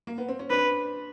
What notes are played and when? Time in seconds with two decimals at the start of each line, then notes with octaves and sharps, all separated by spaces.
0.07 A#3
0.18 B3
0.28 C4
0.39 C#4
0.50 C4 D4 B4